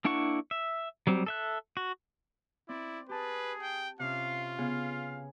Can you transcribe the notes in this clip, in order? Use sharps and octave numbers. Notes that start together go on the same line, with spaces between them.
A#3 D4 E4 F#5 C#6
E5
F#3 G3 C4
A4 E5 F#6
F#4
C4 E4 D5
G4 G#4 B4 A5 D#6
G5
C3 C#4 F4 F5
C#3 B3 G#4 F5